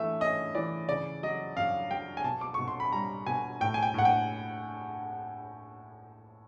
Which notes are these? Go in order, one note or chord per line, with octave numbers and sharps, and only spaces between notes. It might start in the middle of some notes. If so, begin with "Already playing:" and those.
Already playing: E3 A3 E5
C#4 D#5
E3 D5
C#3 D5
F#3 D#5
F#2 F5
F#3 G5
G#5
B2 A5
D6
B2 C#6
C6
B5
G3 A#5
B2 G#5
A2 G5
G#5
G5
A2 F#5
G5